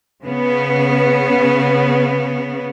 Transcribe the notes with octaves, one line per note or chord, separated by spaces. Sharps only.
C#3 B3